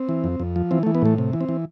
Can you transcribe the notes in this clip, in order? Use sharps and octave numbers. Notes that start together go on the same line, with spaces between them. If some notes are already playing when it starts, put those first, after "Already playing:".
Already playing: C4
E3
F2
F2
F3
E3 C4
A3
E3
B3
A2 A3
C3
E3
C4
E3